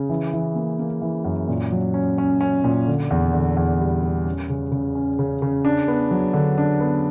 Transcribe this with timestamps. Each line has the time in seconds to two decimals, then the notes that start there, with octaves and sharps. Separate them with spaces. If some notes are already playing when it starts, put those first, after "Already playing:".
Already playing: C#3
0.09 E3
0.33 E3
0.56 A#3
0.79 A#3
1.01 E3
1.25 F#2
1.48 A#2
1.72 F#3
1.94 C#4
2.18 C#4
2.41 C#4
2.64 A#2
2.87 D3
3.11 E2
3.33 D3
3.57 E2
3.80 G3
4.03 G3
4.25 C#4
4.49 C#3
4.72 C#3
4.95 C#4
5.19 C#3
5.42 C#3
5.65 D4
5.88 B3
6.11 F#3
6.33 D3
6.58 D4
6.80 B3